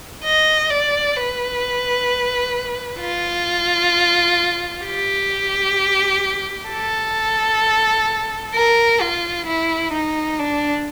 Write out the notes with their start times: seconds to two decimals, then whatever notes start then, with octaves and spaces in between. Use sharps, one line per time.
0.23 D#5
0.70 D5
1.16 B4
3.00 F4
4.85 G4
6.70 A4
8.55 A#4
9.00 F4
9.47 E4
9.92 D#4
10.39 D4